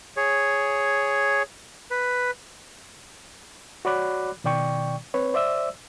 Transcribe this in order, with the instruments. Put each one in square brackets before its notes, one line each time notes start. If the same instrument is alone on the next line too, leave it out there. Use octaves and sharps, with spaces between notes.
[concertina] G#4 C#5
B4
[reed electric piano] F#4 C#5 D5 B5 D6 F#6
B2 D#3 D5 G5 C#6
C4 B4 C#5
C5 D5 E5 E6